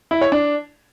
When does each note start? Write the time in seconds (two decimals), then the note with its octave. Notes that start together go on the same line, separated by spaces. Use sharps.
0.11 E4
0.21 C#5
0.32 D4